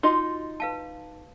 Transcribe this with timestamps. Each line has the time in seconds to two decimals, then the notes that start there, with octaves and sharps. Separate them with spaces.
0.03 D#4 F4 F#4 D#5 C6
0.60 B4 F5 A5